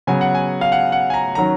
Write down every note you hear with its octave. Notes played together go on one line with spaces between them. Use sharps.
C#3 F#3 B3 G#5
F#5
G#5
F5
F#5
F#5
G#5
A#5
D#3 F#3 C#4 A#5